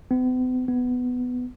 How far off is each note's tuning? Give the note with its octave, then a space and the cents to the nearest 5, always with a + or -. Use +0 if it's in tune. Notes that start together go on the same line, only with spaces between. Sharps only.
B3 +45
B3 +10